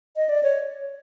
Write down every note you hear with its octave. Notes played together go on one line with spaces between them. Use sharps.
D#5
D5
C#5